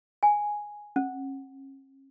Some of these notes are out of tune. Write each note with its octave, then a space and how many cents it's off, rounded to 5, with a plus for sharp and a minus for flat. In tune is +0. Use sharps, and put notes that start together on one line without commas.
G#5 +0
C#4 -40